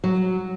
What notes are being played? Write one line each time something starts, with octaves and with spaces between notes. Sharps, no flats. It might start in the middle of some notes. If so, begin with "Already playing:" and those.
F#3